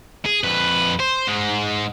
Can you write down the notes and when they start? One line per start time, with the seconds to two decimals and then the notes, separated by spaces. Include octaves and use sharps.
0.25 G#4
0.44 F2 B4
0.99 C5
1.27 G#2 G#3